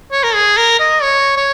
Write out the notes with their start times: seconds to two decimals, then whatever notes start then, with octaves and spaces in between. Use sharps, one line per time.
0.12 C#5
0.23 A#4
0.35 G#4
0.58 A#4
0.80 D#5
1.03 C#5
1.37 C#5